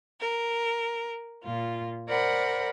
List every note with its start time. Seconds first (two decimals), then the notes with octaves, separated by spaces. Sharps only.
0.19 A#4
1.41 A#2 F4
2.08 A#4 C5 D5 F#5 B5